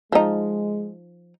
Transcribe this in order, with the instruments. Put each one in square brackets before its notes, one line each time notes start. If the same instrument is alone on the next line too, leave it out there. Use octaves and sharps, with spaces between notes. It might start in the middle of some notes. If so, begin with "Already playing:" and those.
[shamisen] F3 D#4 [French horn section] G#3